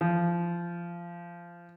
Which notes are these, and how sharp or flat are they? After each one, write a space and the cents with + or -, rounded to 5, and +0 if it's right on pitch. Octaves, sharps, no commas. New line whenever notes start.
F3 -20